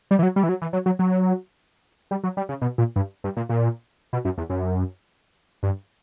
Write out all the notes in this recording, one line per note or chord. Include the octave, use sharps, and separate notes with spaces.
G3
E3
F#3
G3
E3
F#3
E3
F#3
F#3
F#3
G3
F#3
G3
C#3
B2
A#2
G2
G2
A#2
A#2
B2
F#2
E2
F#2
G2